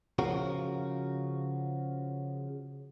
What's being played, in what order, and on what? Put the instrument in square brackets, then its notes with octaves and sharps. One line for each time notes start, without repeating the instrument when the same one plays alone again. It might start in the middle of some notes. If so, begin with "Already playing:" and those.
[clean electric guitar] C#3 F3 F#4 A#4